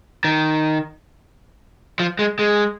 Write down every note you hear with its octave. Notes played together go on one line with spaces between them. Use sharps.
D#3
F3
G#3
G#3